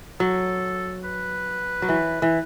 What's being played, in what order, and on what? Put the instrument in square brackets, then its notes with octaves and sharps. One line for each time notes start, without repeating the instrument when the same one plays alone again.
[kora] F#3 [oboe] A4
[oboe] B4
[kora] F#3
E3
E3